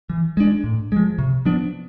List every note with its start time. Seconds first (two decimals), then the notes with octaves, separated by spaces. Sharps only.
0.10 E3
0.37 G#3 D4
0.64 A2
0.92 F3 G#3
1.19 C3
1.45 F3 B3 D4